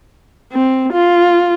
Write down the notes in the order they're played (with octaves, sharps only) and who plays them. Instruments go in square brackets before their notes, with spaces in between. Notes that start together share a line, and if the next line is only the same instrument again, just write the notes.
[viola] C4
F4